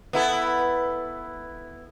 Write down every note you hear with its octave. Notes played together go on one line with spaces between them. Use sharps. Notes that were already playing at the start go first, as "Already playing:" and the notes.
B3 E4 A4